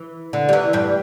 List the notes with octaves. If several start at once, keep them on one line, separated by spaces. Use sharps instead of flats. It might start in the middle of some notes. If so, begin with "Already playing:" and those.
Already playing: E3
D3
G3
E2 E3
G2 G3